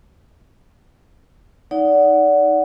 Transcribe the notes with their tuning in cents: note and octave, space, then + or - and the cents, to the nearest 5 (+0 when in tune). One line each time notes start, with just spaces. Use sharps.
D#4 +10 D5 -30 F#5 +0